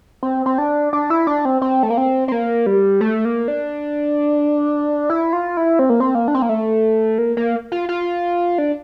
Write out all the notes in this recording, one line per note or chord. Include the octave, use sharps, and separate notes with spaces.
C4
C4
D4
D4
E4
D4
C4
C4
A3
A#3
C4
C4
A#3
G3
A3
A#3
D4
E4
F4
E4
C4
A#3
C4
A#3
D4
C4
A#3
A3
A#3
A#3
F4
F4
D4